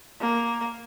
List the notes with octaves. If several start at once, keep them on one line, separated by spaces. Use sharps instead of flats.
A#3